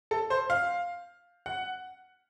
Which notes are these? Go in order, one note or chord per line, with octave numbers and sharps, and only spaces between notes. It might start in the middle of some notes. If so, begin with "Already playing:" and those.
A4
C5
F5
F#5